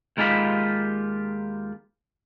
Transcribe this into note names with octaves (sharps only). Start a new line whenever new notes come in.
D#2 G#3 D#4 F4 G4 B5